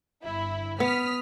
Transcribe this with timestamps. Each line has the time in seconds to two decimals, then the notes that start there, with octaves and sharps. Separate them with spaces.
0.24 G1 E4
0.80 B3 D#6 F6 B6